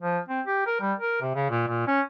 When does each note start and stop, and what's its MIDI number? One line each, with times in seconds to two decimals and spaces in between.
0.01 0.19 53
0.29 0.41 60
0.47 0.65 67
0.67 0.76 70
0.80 0.93 55
0.99 1.21 70
1.22 1.33 48
1.35 1.48 49
1.50 1.62 46
1.67 1.83 46
1.87 2.01 61